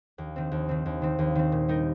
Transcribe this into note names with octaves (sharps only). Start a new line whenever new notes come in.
D#2
D#3 C4
D#2
D#3 C4
D#2
D#3 C4
D#2
D#3 C4
A#2
G3 D#4 A#4